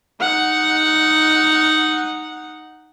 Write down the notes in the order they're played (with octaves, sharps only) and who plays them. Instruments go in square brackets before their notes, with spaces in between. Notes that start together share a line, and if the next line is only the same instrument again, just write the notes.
[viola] D#4 F#5